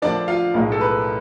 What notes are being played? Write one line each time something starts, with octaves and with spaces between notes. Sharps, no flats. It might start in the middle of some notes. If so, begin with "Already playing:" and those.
D2 D3 F3 D4 D5
F4 F5
B1 A2 G#3
A4
B4